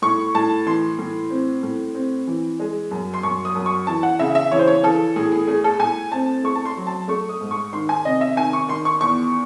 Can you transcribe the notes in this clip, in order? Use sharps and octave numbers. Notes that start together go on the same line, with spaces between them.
A2 C#6
A2 A5
E3 C6
A2
C4
A2
C4
E3
G#3
F#2
C6
F#2 C#6
D#6
F#2
C#6
E3 A5
F#5
C#3 E5
E5
E3 C#5
C5
C#5
E3 A4
A2 G#4
G#4
A3 G#4
A4
A2 G#5
C4 A5
A3 C#6
A5
C6
F#3
A5
A3 C#6
D#6
G#2
C#6
D#3 C6
G#5
C3 D#5
E5
D#3 G#5
C#6
D#3 C6
C#6
E2 C#6